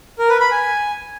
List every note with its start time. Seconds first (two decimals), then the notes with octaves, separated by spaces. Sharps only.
0.19 A#4
0.30 B4
0.40 B5
0.51 G#5